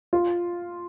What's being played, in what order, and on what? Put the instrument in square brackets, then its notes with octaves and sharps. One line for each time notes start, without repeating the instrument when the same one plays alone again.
[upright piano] F4